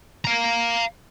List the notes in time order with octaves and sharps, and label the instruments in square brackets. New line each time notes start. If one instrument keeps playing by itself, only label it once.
[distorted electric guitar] F5 A#5